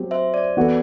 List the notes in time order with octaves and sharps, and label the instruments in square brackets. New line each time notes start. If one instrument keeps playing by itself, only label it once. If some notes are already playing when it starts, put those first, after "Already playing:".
Already playing: [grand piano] F#3 C4 G4
[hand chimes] C5 E5
D5
[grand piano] E3 B3 F#4 A4